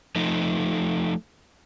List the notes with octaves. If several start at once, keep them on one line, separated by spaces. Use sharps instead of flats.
F3 A3 D#4